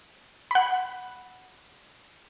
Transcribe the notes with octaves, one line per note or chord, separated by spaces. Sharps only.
F#5 B5